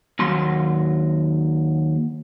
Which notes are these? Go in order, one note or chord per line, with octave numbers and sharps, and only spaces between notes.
D#2 F#3 C6